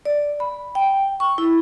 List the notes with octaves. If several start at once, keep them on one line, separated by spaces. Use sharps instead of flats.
D5
B5
G5
C#6
E4